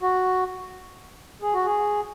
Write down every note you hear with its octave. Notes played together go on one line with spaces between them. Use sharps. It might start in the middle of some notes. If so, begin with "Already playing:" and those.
F#4
G#4
F#4
G#4